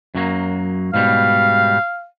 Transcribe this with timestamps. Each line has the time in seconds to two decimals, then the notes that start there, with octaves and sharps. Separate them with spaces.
0.15 F#2 F#3 A#3
0.94 G#2 B2 G3 F5